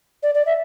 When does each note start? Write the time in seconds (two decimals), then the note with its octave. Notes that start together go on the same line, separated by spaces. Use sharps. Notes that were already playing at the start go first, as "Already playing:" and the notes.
0.23 D5
0.35 D5
0.46 E5